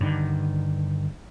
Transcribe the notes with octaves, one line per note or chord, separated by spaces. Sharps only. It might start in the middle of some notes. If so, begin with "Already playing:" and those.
G2 D3 D#3